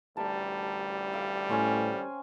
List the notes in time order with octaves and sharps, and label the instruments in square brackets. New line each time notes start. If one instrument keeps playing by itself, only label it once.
[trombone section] A1 D2 G3 [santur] A#4 A5
[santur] F5 D6 E6
[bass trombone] A2 [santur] C4 C#4 G#5